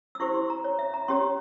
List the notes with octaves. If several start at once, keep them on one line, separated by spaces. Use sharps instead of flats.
E6
E4 G4 C5 C#6
C6
A#5
C#5
E5
A#5
C#4 G4 C#5 C6